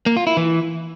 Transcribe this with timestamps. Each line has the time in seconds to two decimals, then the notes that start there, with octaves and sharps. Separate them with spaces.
0.06 A#3
0.17 F4
0.27 E4
0.37 E3